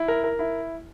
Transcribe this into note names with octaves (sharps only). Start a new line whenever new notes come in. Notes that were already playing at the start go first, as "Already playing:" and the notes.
Already playing: E4
A#4
A#4
E4